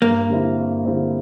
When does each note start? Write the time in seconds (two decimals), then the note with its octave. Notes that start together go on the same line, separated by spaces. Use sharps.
0.02 G2 A#3
0.29 D3 G3 C4 E4
0.58 G2
0.85 D3 G3 C4 E4